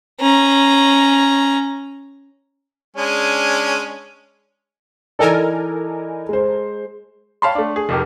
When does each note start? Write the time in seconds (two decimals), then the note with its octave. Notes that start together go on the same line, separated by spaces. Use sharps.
0.20 C#4 A#5
2.97 G#3 C#4 D4
5.19 E3 D#4 A4 A#4 D5 G#5
6.29 G#3 C5
7.42 C#5 F5 G5 A5 B5 C6
7.55 A3 D4
7.76 G#4
7.89 F1 F2 G4 A#4